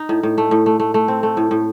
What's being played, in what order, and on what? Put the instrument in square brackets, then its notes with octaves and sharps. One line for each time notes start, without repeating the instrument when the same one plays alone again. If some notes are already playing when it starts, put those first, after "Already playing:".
Already playing: [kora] D#4
A2
A2
A3
A2
A3
A3
A3
C4
A3
A2
A2